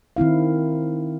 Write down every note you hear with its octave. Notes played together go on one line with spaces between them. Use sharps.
D#3 C4 E4 F5